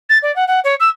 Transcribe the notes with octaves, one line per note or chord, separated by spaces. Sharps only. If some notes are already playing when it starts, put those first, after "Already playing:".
A6
D5
F#5
F#5
C#5
E6